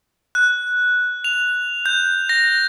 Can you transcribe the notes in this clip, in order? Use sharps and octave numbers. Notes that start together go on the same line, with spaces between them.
F#6
F7
G6
A#6